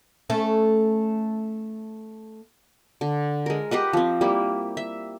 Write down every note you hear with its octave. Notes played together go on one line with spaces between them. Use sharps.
A3 C#4
D3
G#3 A#4
G4 B4 D#5 F#5
F3 C4
G3 A#3 E4
E5